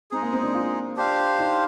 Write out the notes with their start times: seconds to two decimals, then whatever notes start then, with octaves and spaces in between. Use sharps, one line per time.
0.11 G#3 C4 D#4 G#4
0.23 A#3
0.33 C4
0.44 D4
0.54 F4
0.96 D4 G4 C5 F5
1.39 D#4